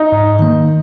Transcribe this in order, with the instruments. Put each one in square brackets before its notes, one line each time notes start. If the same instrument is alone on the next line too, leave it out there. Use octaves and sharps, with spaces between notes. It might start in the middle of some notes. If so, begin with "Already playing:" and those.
Already playing: [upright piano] D#4
[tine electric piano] G#2
D#3 A#3